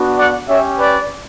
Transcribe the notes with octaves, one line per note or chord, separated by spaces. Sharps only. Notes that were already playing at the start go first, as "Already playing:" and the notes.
Already playing: B3 D4 F#4
D5 F#5
C#4 G4 C#5 E5
B4 D5